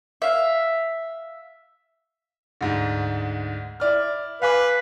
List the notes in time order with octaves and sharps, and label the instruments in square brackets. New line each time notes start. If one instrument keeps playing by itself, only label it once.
[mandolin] E5 F5
[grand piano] D2 G#2
E4 D5 F6
[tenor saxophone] B4 [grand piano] F5 G#5 D6